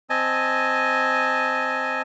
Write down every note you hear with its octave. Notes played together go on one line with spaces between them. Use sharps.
C4 D#5 G#5 A5